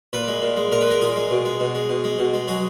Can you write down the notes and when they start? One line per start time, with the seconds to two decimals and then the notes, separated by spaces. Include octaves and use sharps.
0.13 A#2 B4
0.28 G#3
0.42 A#2
0.56 G#3
0.72 A#2 A#4
0.81 B4
0.87 G#3 A#4
1.01 A#2 G#4
1.16 G#3
1.30 B2
1.45 G#3
1.60 B2
1.75 G#3
1.89 B2
2.04 G#3
2.19 B2
2.33 G#3
2.48 F#3 G#4